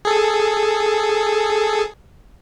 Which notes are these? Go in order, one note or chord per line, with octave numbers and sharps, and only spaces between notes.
G#4 A4